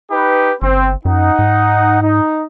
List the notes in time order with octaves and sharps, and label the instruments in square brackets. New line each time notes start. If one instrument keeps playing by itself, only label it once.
[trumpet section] D#4 G4 B4
[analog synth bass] G1 [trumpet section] C4
[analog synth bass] F#2 [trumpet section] D#4 F#5
[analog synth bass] G#2
[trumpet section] D#4